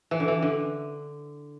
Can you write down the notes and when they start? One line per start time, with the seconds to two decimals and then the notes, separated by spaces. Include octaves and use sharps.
0.11 E3
0.20 D3
0.28 E3
0.42 D3